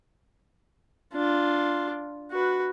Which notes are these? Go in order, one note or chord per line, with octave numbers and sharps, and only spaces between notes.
D4 F4
F#4 B4